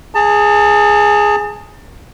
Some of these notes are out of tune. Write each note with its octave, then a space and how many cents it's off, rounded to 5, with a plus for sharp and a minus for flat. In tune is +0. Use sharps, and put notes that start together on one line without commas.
G#4 +0 A5 +30